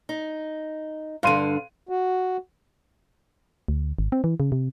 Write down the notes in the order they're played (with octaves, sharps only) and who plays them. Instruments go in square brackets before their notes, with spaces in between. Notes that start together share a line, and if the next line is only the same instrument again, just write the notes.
[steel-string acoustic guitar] D#4
[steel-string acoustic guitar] G2 D3 [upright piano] F5 C6 D#7
[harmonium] F#4
[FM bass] D2
G#1
C4
E3
C#3
C3